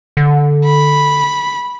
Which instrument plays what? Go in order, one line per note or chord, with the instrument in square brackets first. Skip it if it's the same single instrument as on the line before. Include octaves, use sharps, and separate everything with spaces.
[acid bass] D3
[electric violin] B5